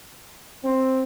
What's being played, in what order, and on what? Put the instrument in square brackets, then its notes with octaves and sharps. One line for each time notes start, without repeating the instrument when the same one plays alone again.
[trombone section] C4